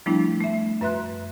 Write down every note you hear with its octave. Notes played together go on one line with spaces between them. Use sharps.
F3 G3 A3 B3 D4 E4
A3 E5
F#2 B4 E5 C6 F#6